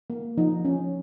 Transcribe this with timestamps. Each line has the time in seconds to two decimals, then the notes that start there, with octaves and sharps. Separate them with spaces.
0.10 A#3
0.38 F3 D#4
0.65 F3 C#4